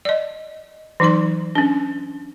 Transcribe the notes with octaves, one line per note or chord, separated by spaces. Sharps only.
D5 D#5
E3 F#3 D#4 D5 C6
C#4 D4